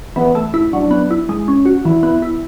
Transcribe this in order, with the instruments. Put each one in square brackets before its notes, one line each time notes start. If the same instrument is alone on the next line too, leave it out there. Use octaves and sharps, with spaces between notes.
[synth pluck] E3 [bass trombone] B3
[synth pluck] A3
E4
[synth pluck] F#3 [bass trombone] D4
[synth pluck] B3
E4
G#3
C#4
F#4
[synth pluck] E3 [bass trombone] E4
[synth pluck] B3
E4